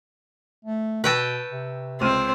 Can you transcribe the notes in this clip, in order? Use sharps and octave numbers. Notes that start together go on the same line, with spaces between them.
A3
B2 B4 G5 A5 C#6 E6 A#6
C3
C#2 C4 F6 D#7